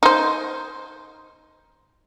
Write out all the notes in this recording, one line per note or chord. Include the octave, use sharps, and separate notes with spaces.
D#4 C5